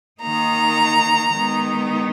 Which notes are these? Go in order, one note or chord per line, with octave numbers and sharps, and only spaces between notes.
D#3 A#3 D#4 A#5
D#3 G#3 B3 D#4